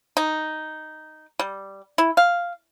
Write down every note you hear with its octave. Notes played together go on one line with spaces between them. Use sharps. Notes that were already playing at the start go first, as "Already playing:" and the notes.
D#4
G3
E4
F5